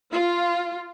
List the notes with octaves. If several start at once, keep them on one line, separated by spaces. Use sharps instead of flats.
F4